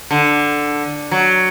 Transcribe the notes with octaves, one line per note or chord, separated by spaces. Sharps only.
D3
F#3